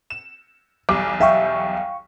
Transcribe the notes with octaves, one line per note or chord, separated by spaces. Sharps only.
E7
B1 E2 G3 D6
E5 F5 G5 C#6